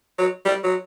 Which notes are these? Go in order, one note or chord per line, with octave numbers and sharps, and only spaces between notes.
F#3
G3
F#3